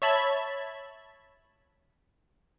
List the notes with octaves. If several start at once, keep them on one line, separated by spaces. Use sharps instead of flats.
C#5 E5 A5 B5 G#6